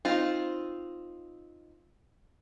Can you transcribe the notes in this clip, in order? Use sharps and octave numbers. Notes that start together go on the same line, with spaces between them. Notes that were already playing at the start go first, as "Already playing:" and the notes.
C4 D#4 F4